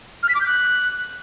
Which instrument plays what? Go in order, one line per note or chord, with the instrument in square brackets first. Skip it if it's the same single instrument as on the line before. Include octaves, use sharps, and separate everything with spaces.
[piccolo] F6
B6
D6
G6
F#6